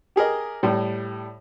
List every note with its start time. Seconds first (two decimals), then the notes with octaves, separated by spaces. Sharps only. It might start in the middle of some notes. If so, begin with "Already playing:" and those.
0.16 G4 G#4 A#4 D#5
0.63 A2 G3